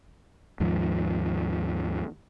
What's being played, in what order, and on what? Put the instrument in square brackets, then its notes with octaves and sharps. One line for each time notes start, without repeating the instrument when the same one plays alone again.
[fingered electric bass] D#2 G#2 F3